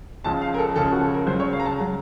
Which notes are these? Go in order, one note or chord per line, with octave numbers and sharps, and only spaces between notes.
C#2 C#3 F3 A5
F5
A#4
A4
C#2 C#3 F3 A4
F#4
A4
A#4
C#2 C#3 F#3 C5
C#5
F5
A#5
A5
C#3 F#3 A#5